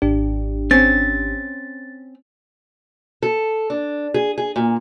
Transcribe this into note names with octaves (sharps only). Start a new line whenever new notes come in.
G#1 D4 G4
C4 C#4 A6
A4
D4
G#4
G#4
A#2